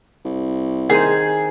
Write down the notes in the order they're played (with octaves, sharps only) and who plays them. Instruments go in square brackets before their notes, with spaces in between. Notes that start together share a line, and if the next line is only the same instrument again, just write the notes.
[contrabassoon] C2
[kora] D#3 D#4 C5 [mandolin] G#4